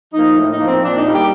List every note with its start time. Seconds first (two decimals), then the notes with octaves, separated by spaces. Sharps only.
0.13 F3 A#3 D#4
0.36 A2
0.51 D#4
0.59 F3 A#3
0.67 C4
0.83 A#2 D4
0.98 D#4
1.06 G3 A#3
1.13 G4